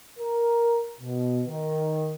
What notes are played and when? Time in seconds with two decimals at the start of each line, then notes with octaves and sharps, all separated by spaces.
0.19 A#4
1.01 B2
1.47 D#3